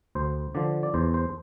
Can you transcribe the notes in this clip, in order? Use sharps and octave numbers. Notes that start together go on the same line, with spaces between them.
D2 C5
D3 F3 D5
D5
E2 C5
C5